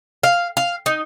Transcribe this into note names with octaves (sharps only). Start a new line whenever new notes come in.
F5
F5
D#4